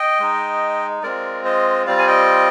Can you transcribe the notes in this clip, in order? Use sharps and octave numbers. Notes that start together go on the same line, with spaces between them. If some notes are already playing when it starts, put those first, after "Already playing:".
Already playing: D#5 G5
G#3 D#4
G#3 C4 F4 A#4 D5
C5 D#5
G3 C4 F4 D5 F5
G#5
D#5 G5